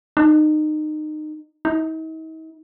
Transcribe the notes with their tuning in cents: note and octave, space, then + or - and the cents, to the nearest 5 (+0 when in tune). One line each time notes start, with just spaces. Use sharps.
D#4 -25
D#4 +45